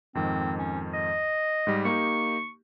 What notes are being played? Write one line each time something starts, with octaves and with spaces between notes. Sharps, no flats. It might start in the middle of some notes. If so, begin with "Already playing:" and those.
F2 G#2 D#3 C4
C#4
D#5
G#2 G3
A#3 D#4 G4 C#6